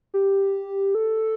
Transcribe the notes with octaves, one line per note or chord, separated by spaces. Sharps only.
G4
A4